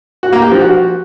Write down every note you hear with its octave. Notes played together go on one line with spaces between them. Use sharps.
F#4
A#3
G4
F3
F#4